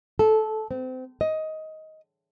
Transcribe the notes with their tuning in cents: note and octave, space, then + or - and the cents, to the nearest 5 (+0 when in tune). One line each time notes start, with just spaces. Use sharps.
A4 -15
C4 -30
D#5 +15